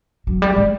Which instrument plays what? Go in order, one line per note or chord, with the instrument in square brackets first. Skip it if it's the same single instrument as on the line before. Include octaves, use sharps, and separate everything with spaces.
[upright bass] F#3
G3
G#3